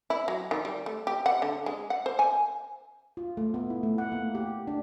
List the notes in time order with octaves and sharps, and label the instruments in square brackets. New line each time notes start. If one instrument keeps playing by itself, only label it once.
[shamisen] E4
F#3
D#3
G3
A3
G4
F#5
D3
G#3
F#5
C5
G#5
[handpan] F4
A3
B3
E4
A3
F#5
A#3
G4
D4